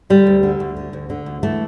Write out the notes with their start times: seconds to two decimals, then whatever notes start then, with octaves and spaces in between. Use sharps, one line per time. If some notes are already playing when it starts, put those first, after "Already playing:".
0.10 D3 G3
0.27 D2
0.43 D3
0.60 D2
0.77 D3
0.93 D2
1.10 D3
1.26 D2
1.43 E3 A3